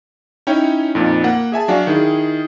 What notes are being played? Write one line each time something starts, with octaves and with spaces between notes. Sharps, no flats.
C#4 D#4 E4 C#5 G5
F2 A#2 D#4
A#3 F#5
G#4 E5 G#5 A5
F#3 D4 F#4 F5
D#3 E4 G#4